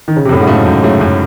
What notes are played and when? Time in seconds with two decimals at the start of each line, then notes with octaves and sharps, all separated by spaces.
0.08 D#3
0.16 C#3
0.25 C3
0.29 F#2 A2
0.41 G#2
0.47 C#3 F#3 A3
0.53 G#2
0.65 F#2
0.83 C#3 F#3 A3
1.01 F#2